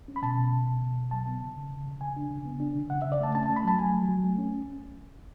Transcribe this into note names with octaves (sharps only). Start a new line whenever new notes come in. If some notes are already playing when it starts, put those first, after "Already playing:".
C#4
B5
B2 A5
B2
B2
B2
B2
B2
F#3 A5
B3
C#3
C#3
C#3
C#3
C#3 G#5
D4
C#3
B3
D4
C#3
C#3 F#5
C#3 E5
D5
A3 A5
C#4 A5
A3 A5
B5
F#3 A5
A3 G#5
F#3
F#3
A3
C#4